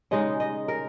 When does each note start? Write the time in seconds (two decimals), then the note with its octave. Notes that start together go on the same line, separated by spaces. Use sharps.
0.11 C#3 G#3 D#4 D#5
0.40 D#5
0.68 A#4